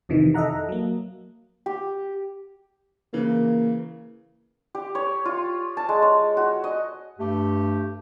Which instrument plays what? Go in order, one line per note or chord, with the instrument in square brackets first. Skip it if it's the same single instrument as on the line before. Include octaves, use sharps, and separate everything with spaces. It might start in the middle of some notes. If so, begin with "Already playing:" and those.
[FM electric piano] F2 C3 D#3 E3
A4 D#5 E5 F#5 A#5
F#3 A#3
[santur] G4
[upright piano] C#3 E3 [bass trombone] A#3
[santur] G4
C#5
F4
A5
G#3
C#5
F#4
D#5
[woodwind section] G2 A3 G4